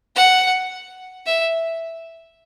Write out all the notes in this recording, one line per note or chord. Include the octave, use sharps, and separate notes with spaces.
F#5
E5